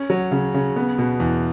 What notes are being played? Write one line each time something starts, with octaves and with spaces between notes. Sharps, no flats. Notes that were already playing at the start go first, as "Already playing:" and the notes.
Already playing: C#4
F#3
C#3
C#3
B3
B2
E2